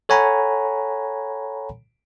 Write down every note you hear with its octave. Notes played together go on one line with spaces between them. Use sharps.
A4 C#5 F#5 G#5 A#5 B5